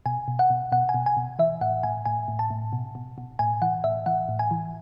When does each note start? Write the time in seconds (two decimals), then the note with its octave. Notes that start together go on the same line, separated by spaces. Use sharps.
0.06 B2 G#5
0.28 B2
0.39 F#5
0.50 B2
0.72 B2 F#5
0.89 G#5
0.94 B2
1.06 G#5
1.17 B2
1.39 E3 E5
1.61 A2 F#5
1.83 A2 G#5
2.06 A2 G#5
2.28 A2
2.39 A5
2.50 A2
2.73 B2
2.95 B2
3.18 B2
3.39 A2 G#5
3.62 E3 F#5
3.84 A2 E5
4.06 E3 F#5
4.29 A2
4.39 G#5
4.51 E3